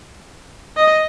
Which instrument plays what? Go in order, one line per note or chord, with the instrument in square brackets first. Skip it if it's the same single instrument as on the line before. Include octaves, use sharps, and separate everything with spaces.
[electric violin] D#5